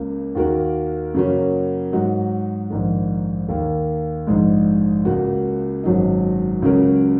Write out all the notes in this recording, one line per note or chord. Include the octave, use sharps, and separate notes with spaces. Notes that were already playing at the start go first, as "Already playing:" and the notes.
Already playing: C#2 C#3 A#3
D#2 D#3 A#3 F#4 A#4
F#2 C#3 F#3 A#3 C#4
G#2 F#3 D#4 F#4
A#1 G#2 D#3
D#2 D#3 A#3
A#1 G#2 G#3 D#4
C#2 C#3 A#3 F#4
G#1 F#2 F#3 D#4
C#2 C#3 F#3 C#4 A#4